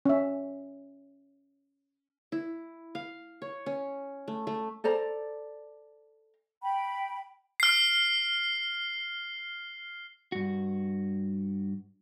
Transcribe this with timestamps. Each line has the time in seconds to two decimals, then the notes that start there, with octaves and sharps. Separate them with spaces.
0.05 C#4 E5
2.32 E4
2.95 F5
3.42 C#5
3.66 C#4
4.28 A3
4.47 A3
4.84 A4 C5 D5 A#5
6.63 G5 B5
7.60 F6 C7
10.32 G2 F#4